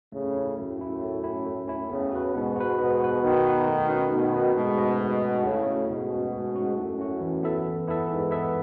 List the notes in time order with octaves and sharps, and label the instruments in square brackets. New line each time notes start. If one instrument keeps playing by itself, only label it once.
[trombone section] A2 C#3 [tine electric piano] A3
[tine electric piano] C#4 E4
[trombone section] F#2 A2 [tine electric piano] A3
[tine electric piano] C#4 E4
A3
C#4 E4
A3
C#4 E4
[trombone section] A2 C#3 [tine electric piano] B3
[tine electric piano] F#4 B4
[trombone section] G#2 B2 [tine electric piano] B3
[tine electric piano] F#4 B4
[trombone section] G#2 B2 [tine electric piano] B3
[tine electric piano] F#4 B4
[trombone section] B2 D#3 [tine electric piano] B3
[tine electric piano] F#4 B4
A3
C#4 F#4 B4 D#5
[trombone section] B2 D#3 [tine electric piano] A3
[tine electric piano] C#4 F#4 B4 D#5
[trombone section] G#2 B2 [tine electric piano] A3
[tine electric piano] C#4 F#4 B4 D#5
A3
C#4 F#4 B4 D#5
[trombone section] A2 C#3 [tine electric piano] A3
[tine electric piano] C#4 F#4
[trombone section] G#2 B2 [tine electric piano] A3
[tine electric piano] C#4 F#4
A3
C#4 F#4
[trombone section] F#2 A2 [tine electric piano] A3
[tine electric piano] C#4 F#4
E3
B3 E4 A4 E5
E3
B3 E4 A4 E5
[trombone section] G#2 [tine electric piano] E3
[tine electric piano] B3 E4 A4 E5